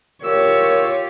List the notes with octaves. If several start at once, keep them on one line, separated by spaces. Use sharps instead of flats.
F4 G4 A#4 C#5 E6